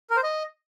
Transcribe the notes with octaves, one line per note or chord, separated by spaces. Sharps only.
A#4
C5
D#5